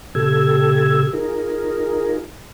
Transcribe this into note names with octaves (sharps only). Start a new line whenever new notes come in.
A#2 C#3 G4 A4 E6 G#6
D#4 F4 G#4 A#4